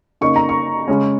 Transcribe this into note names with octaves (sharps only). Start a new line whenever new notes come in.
C#3 A#3 D#4 C#6
A#5
C#6
C#3 G#3 C#4